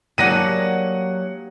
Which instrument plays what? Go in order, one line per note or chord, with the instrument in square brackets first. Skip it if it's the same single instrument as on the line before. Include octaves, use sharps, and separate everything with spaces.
[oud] F#3 D4 [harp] A#3 G4 G#4 [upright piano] F#5 A#6 D#7